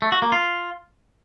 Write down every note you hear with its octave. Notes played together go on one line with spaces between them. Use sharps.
A3
F#4
A#3
F4